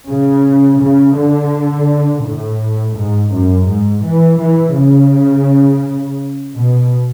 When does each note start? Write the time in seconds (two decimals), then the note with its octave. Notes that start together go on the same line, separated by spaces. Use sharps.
0.10 C#3
0.81 C#3
1.18 D3
2.25 A2
2.97 G#2
3.33 F#2
3.69 G#2
4.05 E3
4.41 E3
4.77 C#3
6.57 B2